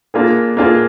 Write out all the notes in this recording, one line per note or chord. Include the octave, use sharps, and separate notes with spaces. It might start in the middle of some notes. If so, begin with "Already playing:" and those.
A#3 D4 F4 G#4
A#3 D4 F4 G#4